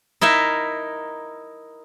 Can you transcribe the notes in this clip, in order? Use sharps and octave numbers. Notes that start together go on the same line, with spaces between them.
D#4 E4 A#4 E5